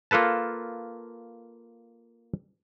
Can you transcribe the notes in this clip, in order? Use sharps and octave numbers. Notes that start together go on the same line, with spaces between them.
A#3 F4 A4 B4 A5